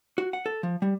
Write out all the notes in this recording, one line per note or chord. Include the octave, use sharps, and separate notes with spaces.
F#4
F#5
A4
F3
G3